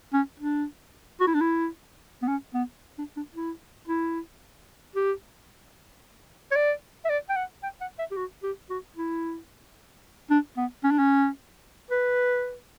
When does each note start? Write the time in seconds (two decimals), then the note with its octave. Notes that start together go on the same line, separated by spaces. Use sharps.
0.14 C#4
0.40 D4
1.21 F#4
1.27 E4
1.35 D4
1.41 E4
2.23 B3
2.28 C#4
2.54 B3
2.99 D4
3.17 D4
3.35 E4
3.88 E4
4.96 G4
6.52 C#5
6.56 D5
7.05 E5
7.10 D5
7.29 G5
7.36 F#5
7.63 G5
7.81 F#5
7.99 E5
8.11 G4
8.17 F#4
8.43 G4
8.70 F#4
8.97 E4
10.31 D4
10.57 B3
10.84 C#4
10.91 D4
10.99 C#4
11.91 B4